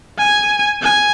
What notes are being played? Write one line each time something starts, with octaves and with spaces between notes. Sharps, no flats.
G#5
G#5